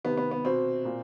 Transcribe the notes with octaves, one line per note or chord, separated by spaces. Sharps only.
C3 D#3 B3
B3
B3
B2 C4
A#2